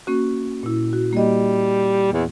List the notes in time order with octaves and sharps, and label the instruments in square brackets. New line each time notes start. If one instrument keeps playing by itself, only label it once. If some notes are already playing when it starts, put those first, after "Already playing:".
[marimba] A#3 C#4 F#4
A#2 E4
F#4
[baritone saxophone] G3 [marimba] A#3 D#5
[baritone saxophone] E2